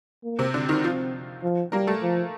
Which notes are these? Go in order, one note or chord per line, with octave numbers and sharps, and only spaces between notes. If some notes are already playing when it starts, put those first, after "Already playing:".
A#3
C3 C4
D3 C4 D4
D#3 D#4
F3 F4
F3
G3 A#3 A#4
A3 A4
F3